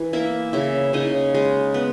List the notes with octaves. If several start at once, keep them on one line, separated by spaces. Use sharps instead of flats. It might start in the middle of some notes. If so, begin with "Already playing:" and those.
Already playing: E3
A#3 E4 E5
C#3 E4 E5
C#3 D#4 D#5
G#3
B3